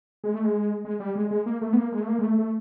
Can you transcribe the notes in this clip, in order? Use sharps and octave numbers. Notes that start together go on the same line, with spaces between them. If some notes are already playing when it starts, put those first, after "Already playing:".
G#3
A3
G#3
G#3
G3
G#3
G#3
A#3
A3
B3
A#3
G#3
A3
A#3
G#3
A3
A3